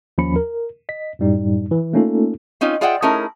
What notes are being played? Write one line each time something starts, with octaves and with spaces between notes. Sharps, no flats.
D#2 F3 C#4 B5 C#7
A#4
D#5 B6
F#2 A2 G3 D#4
E3
A3 A#3 C#4 D#4 F4 A4
C4 C#4 D#4 F4
F4 G#4 D5 E5 F#5 G5
A3 C#4 D#4 E4 G#4 A#4